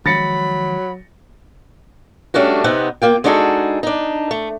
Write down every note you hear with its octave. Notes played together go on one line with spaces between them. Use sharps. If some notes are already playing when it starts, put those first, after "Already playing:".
D#3 F3 F#3 G#3 B5 A6 A#6 C#7
G3 A3 C#4 D4 F#4
C3 B3 C4 D#4 F#5
A#3 F4 G5
G#3 D4 D#4 F#4 G#4 A4
D4 D#4
A3